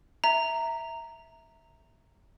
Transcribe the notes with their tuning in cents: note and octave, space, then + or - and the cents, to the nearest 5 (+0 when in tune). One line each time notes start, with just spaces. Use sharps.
E5 -10 A#5 -10